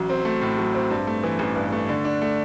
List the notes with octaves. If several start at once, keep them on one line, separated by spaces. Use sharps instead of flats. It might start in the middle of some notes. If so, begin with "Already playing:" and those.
Already playing: A1 F#3
C4
A3
A2
F#3
C4
G2
A3
E3
A1
G2
A3
D3
D4
A3